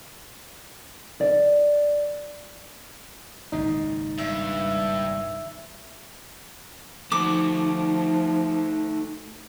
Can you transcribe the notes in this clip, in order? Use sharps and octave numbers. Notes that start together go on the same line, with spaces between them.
D5
G#1 C#2 A#2 D#4
G2 E5
F3 A3 D#4 F#4 D6